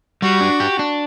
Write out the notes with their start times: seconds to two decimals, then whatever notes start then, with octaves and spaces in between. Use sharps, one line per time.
0.22 G3 F#4
0.41 D4
0.60 G4
0.79 D4